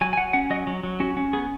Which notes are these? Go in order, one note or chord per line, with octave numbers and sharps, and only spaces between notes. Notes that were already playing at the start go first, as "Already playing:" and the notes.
F#3 G#5
G#5
F#3 F#5
C#4 F#5
F#3 D#5
F#3
F#3
C#4 F#4
C#4
B3 G#4